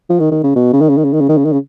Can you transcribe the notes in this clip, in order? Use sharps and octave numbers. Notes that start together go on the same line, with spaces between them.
F3
D#3
D#3
C#3
B2
C#3
D#3
C#3
D#3
C#3
D#3
C#3
D#3
C#3
D#3
C#3